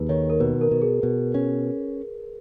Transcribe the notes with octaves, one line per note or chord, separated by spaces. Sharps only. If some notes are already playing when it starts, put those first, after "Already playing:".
Already playing: D#2 G#4 B4
D#3 C#5
A#4
B2 B4
A#4
B2
G#4
B2
C#4